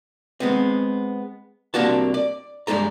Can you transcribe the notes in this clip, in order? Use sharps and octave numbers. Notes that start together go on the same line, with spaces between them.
G#3 B3 C4
C2 C3 A#3 D4 F#4 A5
D5
G2 G3 G#3 A4 A#5